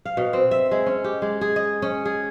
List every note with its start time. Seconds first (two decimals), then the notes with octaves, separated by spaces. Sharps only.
0.05 F5
0.17 B2
0.33 C4
0.51 E5
0.71 G#3
0.86 C#4
1.04 G4
1.22 G#3
1.41 G#4
1.56 D#5
1.82 C#4
2.05 G#4